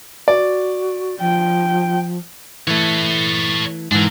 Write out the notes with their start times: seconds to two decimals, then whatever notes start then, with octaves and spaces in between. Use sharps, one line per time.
0.28 F#4 D5
1.20 F3 G5
2.67 E3 A3 A4 C#5
3.92 G#2 E3 D4 A#4